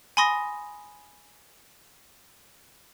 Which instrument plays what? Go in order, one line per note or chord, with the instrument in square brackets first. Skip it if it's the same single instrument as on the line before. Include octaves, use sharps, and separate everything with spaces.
[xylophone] G#5 B5 C6 D#6 A#6